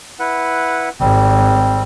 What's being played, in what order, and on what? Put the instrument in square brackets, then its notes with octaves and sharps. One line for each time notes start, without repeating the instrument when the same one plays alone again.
[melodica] E4 B4 F#5
[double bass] G#1 [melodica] G3 C4